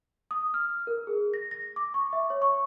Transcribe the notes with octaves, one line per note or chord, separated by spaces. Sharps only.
D#6
F6
A#4
G#4
A#6
A#6
D6
C#6
E5
C#5
C#6